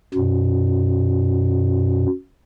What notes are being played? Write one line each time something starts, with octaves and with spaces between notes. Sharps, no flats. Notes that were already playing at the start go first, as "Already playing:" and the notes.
F#2 B2